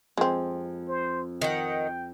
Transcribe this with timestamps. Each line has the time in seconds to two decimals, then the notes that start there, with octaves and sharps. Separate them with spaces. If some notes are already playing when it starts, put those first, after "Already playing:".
0.17 F2 G#3 C4
0.88 C5
1.42 D#3 F#5 G5